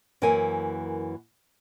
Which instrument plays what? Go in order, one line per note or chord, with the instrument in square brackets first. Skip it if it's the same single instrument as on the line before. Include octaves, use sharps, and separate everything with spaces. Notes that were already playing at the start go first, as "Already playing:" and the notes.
[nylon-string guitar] F#2 E3 A#3 A#4 G#5